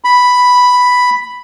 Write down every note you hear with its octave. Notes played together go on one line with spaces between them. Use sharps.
B5